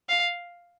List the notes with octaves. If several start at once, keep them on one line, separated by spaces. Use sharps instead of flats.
F5